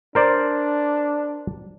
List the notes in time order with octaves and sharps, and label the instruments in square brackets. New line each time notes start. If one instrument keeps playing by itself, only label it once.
[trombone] D4 [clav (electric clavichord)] A#4 C5 D5